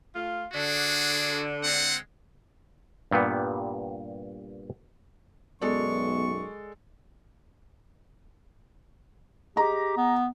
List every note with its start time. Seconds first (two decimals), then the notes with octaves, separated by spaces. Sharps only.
0.15 A3 F4
0.54 D3 D4 F#4 G#4
1.64 G#3 C4 F#5
3.11 G2 A#2 G3 B3
5.62 B1 F#2 G#3 B3 A4 D5 C#6
9.56 G4 G#4 D#5 A#5
9.97 B3